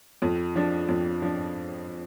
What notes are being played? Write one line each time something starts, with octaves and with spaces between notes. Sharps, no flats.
F2
F3 D4
F2
F3 D4